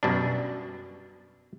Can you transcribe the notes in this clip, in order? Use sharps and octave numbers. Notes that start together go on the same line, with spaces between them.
F#2 B2 G3 D4